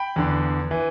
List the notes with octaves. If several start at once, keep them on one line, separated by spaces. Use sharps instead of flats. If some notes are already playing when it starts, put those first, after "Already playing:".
Already playing: G5 B5
E2 D3
E3